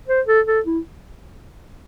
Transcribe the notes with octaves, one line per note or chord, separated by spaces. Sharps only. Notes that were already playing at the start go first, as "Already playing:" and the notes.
C5
A4
A4
E4